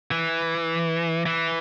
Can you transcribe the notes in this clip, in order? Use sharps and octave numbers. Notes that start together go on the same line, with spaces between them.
E3
E3